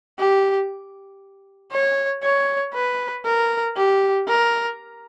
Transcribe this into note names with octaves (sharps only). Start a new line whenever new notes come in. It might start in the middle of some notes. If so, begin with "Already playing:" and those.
G4
C#5
C#5
B4
A#4
G4
A#4